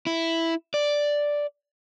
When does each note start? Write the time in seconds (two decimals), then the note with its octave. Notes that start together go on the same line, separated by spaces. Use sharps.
0.07 E4
0.74 D5